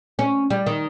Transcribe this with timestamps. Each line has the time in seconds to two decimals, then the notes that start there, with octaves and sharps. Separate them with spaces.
0.19 C#4
0.50 G3
0.66 D#3